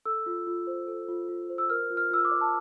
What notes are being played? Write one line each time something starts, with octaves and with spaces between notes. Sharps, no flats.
A4 E6
F4
F4
C5
A4
F4
F4
C5
E6
A#4 F6
F4
F6
F4 E6
D6
D5
A5